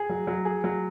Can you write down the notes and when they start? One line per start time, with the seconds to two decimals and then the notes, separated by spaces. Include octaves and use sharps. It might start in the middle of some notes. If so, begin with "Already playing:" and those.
Already playing: G#4
0.10 F#3
0.27 F#3
0.45 G#4
0.64 F#3